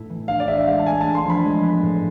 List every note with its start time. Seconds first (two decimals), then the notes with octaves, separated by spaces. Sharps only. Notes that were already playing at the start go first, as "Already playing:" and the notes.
Already playing: A2 A3 B3 E4
0.09 E3
0.28 D4 F5
0.40 D5
0.48 G#4 E5
0.58 E5
0.67 G#3 F5
0.79 A5
0.86 A3 G#5
1.01 D4 A5
1.15 C6
1.25 F3
1.30 B5
1.45 G#3
1.64 B3
1.82 A2